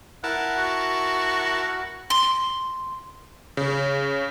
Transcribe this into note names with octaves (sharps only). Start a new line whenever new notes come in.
E4 A#4 F#5 A5
F#4
C6
C#3